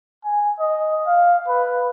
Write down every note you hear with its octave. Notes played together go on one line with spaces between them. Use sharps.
G#5
D#5
F5
B4